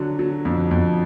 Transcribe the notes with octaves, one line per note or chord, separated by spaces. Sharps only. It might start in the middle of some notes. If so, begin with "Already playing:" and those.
Already playing: D3 F#3
F#3
F2
F2